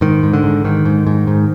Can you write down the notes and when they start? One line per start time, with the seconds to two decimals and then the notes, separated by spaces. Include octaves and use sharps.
0.01 G#2 D#3
0.23 G#2
0.33 D3
0.43 G#2
0.65 G#2 D#3
0.85 G#2
1.07 G#2
1.27 G#2